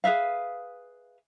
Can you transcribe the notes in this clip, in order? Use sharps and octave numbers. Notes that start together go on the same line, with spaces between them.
G#4 B4 E5 F5